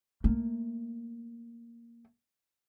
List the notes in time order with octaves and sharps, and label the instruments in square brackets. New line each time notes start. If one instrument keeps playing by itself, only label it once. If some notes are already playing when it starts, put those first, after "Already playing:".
[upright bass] A3 A#3